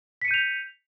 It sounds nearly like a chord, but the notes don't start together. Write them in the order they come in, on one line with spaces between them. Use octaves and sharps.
B6 C#7 D#7 G6 F7